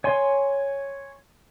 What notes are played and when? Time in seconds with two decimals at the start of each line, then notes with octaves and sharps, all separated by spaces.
0.04 C#5 G#5 C6